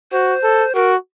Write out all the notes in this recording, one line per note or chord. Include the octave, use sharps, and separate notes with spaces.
F#4 C5
A4
F#4 A#4